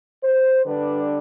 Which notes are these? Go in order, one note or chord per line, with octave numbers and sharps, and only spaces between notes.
C5
D3 G3 D4 B4